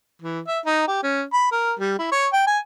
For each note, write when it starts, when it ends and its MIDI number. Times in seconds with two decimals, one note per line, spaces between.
0.22 0.39 52
0.47 0.59 76
0.65 0.85 63
0.88 1.03 67
1.03 1.23 61
1.33 1.50 83
1.51 1.73 70
1.79 1.94 55
1.98 2.10 64
2.11 2.27 73
2.33 2.44 79
2.47 2.58 80